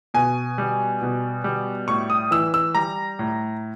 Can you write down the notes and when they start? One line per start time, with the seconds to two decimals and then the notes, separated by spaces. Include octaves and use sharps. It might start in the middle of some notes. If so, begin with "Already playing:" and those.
0.14 B2 G#5
0.58 G3
1.02 B2
1.44 G3
1.88 A2 C#6
2.10 D#6
2.31 E3 E6
2.54 E6
2.75 G3 A#5
3.19 A2